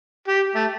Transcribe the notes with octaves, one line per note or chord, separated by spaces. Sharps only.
G4
A3